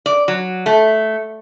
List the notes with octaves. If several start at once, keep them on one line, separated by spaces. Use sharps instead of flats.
D5
F#3
A3